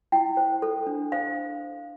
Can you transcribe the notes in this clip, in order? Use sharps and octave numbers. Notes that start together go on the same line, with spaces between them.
E4 G5
C5
A4
D4
C5 F5